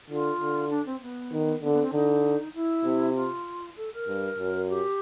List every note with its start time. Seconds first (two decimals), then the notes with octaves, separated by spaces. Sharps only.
0.10 D3 F4
0.40 D3
0.70 D4
0.86 C4
1.02 B3
1.32 D#3
1.63 D3 B3
1.73 B3
1.83 C4
1.93 D3 D#4
2.54 E4
2.85 C3
3.15 F4
3.76 A4
3.93 A#4
4.08 G2
4.38 F#2
4.69 G4